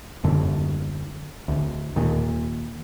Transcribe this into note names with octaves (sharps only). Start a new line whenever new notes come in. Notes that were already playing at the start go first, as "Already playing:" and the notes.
D#1 F#2 D3
D1 D2
D#2 A#2